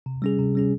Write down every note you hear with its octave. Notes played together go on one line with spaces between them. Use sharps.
C3
G3 C#4 G#4
C3
G3 C#4 G#4